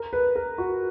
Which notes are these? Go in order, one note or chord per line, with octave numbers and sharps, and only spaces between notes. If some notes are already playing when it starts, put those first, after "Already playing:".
Already playing: A#4
B4
A#4
F#4